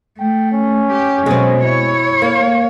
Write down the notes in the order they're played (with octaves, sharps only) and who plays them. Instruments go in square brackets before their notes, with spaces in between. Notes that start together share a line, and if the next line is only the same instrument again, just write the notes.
[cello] A3 [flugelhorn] G5
[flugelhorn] C#4
[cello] G4
[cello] B2 F#3 [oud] G#3 C4
[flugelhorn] E4 [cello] C#5
[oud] A#3